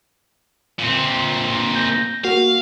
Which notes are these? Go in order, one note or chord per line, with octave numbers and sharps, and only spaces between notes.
A#2 C4
G6 A#6
A#3 F#4 F5